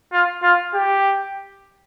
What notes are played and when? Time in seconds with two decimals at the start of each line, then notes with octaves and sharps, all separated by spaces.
0.12 F4
0.43 F4
0.74 G4